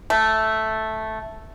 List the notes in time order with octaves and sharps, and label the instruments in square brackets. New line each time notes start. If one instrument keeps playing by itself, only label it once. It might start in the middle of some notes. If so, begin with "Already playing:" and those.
[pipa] A3